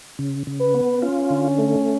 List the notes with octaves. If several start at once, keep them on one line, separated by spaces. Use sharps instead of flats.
C#3
C#3
B4
B3
C#4 F4
D3
A3